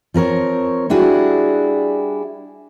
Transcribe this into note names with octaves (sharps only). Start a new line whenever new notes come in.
F3 C4 A#4 C#5
G3 D4 E4 F#4 G#4